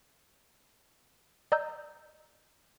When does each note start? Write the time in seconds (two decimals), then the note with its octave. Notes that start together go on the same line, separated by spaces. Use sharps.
1.52 D5 D#5 A#5 E6 G6